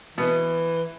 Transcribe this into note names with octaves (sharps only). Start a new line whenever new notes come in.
B2 E3 B3